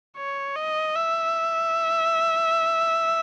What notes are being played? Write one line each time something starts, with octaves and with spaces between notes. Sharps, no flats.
C#5
D#5
E5